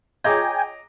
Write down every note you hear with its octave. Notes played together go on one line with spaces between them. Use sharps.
F4 G#4 C#5 D#5 G5 G#5 A#5 D6